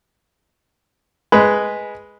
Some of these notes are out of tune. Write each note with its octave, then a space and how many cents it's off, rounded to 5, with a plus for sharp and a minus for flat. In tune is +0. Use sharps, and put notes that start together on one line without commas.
G#3 +0 B4 +0